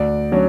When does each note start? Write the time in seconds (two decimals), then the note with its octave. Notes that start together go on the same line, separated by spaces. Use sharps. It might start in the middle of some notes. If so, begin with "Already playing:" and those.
Already playing: D2 D5
0.32 D3 F#3 C#4